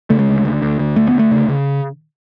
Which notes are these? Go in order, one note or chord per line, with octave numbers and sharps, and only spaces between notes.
C#3 A3
G#3
D2
D2
D2
D2
D2 A3
B3
D2 A3
C#3
C#3